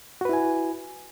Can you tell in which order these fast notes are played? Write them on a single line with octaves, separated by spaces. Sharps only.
F#4 B4 E4 G#5